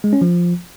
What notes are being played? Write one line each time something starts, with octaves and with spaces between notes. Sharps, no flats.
G#3
C#4
F3